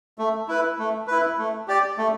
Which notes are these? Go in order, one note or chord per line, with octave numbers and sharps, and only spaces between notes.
A3
E4 B4
A3
E4 B4
A3
G4 D5
A3